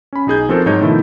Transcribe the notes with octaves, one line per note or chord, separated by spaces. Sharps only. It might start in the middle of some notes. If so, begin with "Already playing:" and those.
C#4 B5
B1 D#4 G#4 G6
F3 C4 F#4 A4 A#4 C5
G#2 F#3 D#4 C#5 G6
B2 D#3 F3 A3 E4